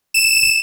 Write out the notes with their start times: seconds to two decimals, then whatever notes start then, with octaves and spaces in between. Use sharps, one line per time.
0.14 E7